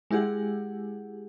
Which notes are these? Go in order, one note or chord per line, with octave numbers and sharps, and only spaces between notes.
G#3 E4 G4 G#4 F#5